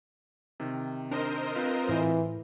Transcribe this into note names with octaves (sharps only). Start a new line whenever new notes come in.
C3 D#3
D4 A#4 C5 D#5
C4 F4 B4
A2 E3